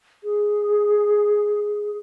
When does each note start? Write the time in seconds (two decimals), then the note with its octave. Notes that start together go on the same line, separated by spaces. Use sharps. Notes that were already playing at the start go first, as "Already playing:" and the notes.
0.24 G#4